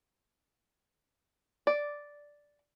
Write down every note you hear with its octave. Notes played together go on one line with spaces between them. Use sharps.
D5